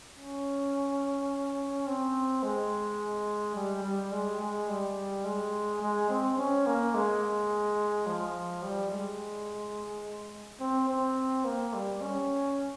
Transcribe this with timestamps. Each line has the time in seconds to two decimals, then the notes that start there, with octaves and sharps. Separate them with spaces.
0.17 C#4
1.87 C4
2.43 G#3
3.55 G3
3.83 G3
4.12 G#3
4.40 G#3
4.69 G3
5.24 G#3
5.81 G#3
6.09 C4
6.38 C#4
6.66 A#3
6.94 G#3
8.07 F3
8.63 G3
8.91 G#3
10.60 C4
10.88 C4
11.44 A#3
11.74 G3
12.02 C#4